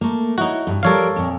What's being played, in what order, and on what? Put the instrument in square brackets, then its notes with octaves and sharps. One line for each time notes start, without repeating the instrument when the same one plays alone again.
[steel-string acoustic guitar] A3 A#3
[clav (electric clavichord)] D#4 F#4 [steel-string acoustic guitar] E4 C#5
[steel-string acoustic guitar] G2
[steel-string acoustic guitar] F3 G3 A#4 [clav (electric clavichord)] A4 C#5 F5
[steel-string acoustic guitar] F2 A#2